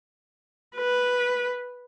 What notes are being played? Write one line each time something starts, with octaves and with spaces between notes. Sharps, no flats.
B4